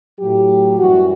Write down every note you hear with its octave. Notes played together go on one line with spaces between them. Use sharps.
A2 F#3 G4
F#2 E3 G3 F#4